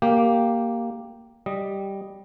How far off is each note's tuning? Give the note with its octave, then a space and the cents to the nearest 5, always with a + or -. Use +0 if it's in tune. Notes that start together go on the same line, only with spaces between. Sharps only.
A#3 +0 G4 +0
G3 +0 D#5 +0